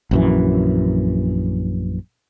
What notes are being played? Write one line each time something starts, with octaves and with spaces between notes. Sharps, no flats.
A#1 F#2 E3